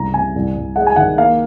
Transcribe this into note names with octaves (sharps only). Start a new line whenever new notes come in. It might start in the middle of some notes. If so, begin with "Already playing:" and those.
Already playing: C2 C#3 A#5
C3 G#5
C2
C2
G#3 F#5
G#5
D#3 F#5
A#3 F5